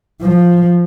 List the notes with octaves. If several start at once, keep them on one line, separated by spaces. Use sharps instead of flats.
F3